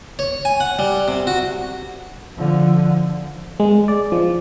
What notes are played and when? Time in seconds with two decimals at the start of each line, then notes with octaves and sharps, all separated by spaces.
0.19 C#5
0.45 G#5
0.60 F#5
0.79 G3
1.08 C3
1.27 F#4
2.36 D3 F3
3.60 G#3
3.88 D5
4.12 F3